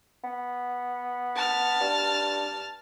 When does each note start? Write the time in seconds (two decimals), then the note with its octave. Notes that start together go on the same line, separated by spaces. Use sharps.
0.24 B3
1.35 A5 F6
1.80 G2